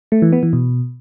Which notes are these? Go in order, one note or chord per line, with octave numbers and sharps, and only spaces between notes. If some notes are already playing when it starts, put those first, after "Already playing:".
A3
E3
B3
E3
B2